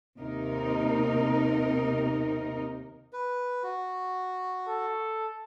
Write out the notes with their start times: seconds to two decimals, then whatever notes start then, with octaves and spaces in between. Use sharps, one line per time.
0.18 D#2 C3 D#4 A#4
3.13 B4
3.63 F#4
4.68 A4